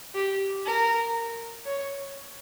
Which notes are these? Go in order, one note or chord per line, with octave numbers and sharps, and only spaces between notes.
G4
A#4
C#5